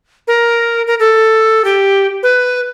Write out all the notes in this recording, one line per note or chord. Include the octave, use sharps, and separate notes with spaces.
A#4
A#4
A4
G4
B4